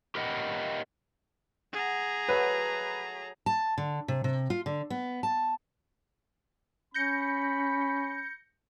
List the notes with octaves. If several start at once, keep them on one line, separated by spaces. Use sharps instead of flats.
G4 A#4 B4 D#5 F#5 G5
G#4 F#5 A#5
F#3 A3 B4
A5
D3
C3
C3
F4
D3
B3
A5
C#4 B5 G6 A#6 C#7